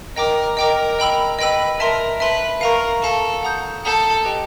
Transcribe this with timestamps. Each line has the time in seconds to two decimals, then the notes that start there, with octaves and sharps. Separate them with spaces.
0.16 A#4 D#5 G5 A#5 D6
0.57 A#4 D#5 G5 A#5 D6
0.99 D#5 G5 B5 E6
1.39 B4 D#5 G5 B5 E6
1.79 A#4 E5 A5 C6
2.20 B4 E5 A5 C6
2.61 A#4 F5 A#5 C#6
3.02 A4 F5 A#5 C#6
3.43 F#5 A#5 D#6 G6
3.84 A4 F#5 A#5 D#6 G6
4.25 G4 B4 D#5 G5